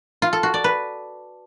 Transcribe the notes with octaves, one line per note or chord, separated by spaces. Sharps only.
F4
A4
F#4
D5
B4